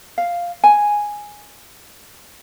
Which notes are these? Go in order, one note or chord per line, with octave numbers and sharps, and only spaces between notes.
F5
G#5